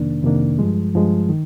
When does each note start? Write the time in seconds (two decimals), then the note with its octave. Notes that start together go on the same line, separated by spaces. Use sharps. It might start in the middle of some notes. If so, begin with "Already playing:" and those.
Already playing: F2 C3 D#3 A#3 D4
0.23 F2 C3 D#3 A#3 D4
0.59 G2 F3 G#3
0.95 G2 F3 G#3
1.30 D#3